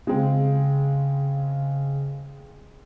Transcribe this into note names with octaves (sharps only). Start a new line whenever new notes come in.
C#3 G#3 C4